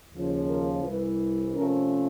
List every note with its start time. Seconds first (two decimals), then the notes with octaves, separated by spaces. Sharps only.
0.13 D#2 C#3 F3
0.48 A#4
0.83 C2 C3 E3 G3 B4
1.55 C3 F3 A3 C#4 A#4